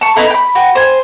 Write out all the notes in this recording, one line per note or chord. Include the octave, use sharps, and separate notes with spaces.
A5 C#6
B3 D#4 E4 A4
G5 B5
F#4 G5
C5 G#5